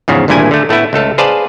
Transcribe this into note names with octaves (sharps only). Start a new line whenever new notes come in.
E2 G#2 C#3 F3
G#1 D2 G2 A#2 E4 G#5
D3 A3
A2 A3 B3 E4
C#2 A3 A4 F5
G#4 B4 C5 D5 F5 A5